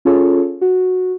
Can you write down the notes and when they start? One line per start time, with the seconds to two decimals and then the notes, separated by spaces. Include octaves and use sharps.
0.05 C#4 F4 G#4 A4 C#5
0.61 F#4